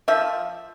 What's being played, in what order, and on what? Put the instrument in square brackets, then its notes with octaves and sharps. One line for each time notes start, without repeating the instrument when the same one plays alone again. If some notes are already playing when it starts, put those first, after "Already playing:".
[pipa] F3 E5